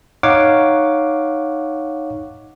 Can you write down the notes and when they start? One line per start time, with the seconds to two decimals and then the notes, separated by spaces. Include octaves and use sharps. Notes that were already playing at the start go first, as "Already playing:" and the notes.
0.23 D#4 C#5 F5 F#5 D6